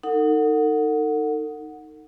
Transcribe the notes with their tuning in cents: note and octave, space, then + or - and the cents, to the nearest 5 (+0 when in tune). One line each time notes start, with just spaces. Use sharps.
D#4 +0 A4 +45 F#5 -10